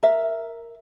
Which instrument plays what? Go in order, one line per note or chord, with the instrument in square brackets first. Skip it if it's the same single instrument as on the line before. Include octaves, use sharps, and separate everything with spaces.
[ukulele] A#4 E5